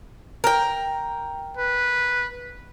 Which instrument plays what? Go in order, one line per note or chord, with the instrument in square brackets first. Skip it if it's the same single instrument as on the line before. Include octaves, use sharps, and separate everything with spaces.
[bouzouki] A#4 G5
[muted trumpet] B4